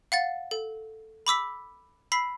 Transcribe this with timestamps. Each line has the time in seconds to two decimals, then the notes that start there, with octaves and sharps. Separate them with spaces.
0.12 F5 F#5 A6
0.51 A4
1.27 B5 D6 E6 B6
2.12 B5 E6 B6 C7